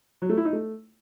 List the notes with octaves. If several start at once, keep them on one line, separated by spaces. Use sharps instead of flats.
F#3
A3
E4
D#4
A3